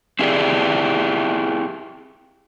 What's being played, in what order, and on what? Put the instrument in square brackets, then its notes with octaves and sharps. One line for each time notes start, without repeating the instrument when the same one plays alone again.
[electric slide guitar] C4 E4 G4 G#4 D5